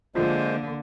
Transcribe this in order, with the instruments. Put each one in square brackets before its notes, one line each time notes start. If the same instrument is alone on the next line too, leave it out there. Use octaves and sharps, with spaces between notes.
[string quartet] D3 [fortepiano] F3 [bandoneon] G#3 C5 [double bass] A#3